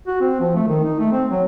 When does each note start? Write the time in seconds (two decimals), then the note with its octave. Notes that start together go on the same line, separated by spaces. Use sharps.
0.07 F#4
0.21 C4
0.40 F3
0.56 A3
0.68 D#3
0.84 D#4
0.99 A3
1.12 C4
1.31 F#3